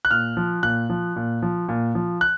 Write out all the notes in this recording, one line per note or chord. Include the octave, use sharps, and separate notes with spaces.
F#6
A#2 F6
F3
A#2 F#6
F3
A#2
F3
A#2
F3
F#6